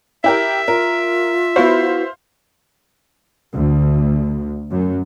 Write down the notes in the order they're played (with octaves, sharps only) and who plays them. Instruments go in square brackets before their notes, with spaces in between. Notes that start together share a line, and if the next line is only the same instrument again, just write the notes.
[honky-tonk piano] E4 G4 A#4 [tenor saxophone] E5
[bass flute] F4 [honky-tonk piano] A#4
[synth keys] B3 E4 F#4 [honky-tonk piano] C5 F5
[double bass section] D2
F#2